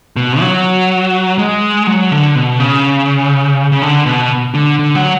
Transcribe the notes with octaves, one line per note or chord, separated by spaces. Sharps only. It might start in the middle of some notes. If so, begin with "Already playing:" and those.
B2
F#3
G#3
F#3
D3
B2
C#3
C#3
D3
B2
D3
D3
F#3